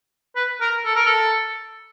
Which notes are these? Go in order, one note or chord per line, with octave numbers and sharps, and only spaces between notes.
B4
A#4
A4
A#4
A4